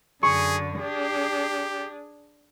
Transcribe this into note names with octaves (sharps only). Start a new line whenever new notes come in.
F#2 D3 G#4 C#6
D4 G4 G#4